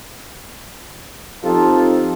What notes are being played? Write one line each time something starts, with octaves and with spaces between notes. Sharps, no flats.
F3 C4 D#4 F4 G4 A4